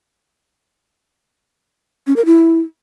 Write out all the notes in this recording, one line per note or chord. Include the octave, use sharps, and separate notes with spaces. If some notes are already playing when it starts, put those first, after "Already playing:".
C#4
A#4
E4